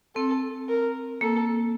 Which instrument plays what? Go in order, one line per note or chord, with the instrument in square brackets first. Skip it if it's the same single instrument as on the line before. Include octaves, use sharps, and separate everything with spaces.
[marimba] C4 [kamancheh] A4
[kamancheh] A#4
[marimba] A#3 [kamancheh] A4